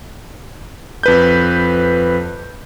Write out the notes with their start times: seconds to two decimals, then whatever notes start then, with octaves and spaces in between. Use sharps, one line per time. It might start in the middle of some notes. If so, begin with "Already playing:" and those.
1.03 F2 B4 G6